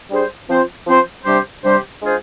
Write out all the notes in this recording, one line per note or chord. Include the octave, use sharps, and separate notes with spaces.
G3 D4 G#4 C5
F3 C4 F4 C5
F3 C4 F4 C5
C3 G3 D4 G4 C5
C3 G3 D4 G4 C5
G#3 D4 F4 G#4 C5